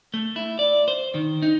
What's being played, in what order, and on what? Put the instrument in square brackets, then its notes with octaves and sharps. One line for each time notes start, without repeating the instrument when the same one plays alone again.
[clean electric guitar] A3
E4
D5
C5
D#3
D#4